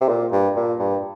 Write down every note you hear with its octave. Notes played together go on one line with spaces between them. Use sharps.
C3
A#2
G2
A#2
G2